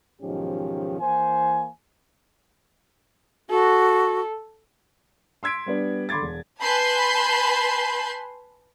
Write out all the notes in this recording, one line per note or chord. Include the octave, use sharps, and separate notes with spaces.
B1 G#2 D#3 F3 C#4 G4
E3 A#3 C5 G#5
F#4 A4
C6 E6 G#6 B6 D7
G3 B3 D4
D3 B5 C6 D6 G#6 A6
E1
B4 G#5 A5 B5 C6 G6